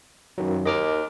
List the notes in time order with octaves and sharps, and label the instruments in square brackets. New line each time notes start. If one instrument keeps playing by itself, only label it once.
[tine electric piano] F#2 D#3 F#3
[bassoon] D#2 [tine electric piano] D#5 D6 F6